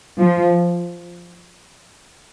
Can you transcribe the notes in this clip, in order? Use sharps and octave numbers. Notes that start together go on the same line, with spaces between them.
F3